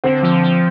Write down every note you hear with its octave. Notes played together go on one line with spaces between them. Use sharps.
D3 C4
F3
F3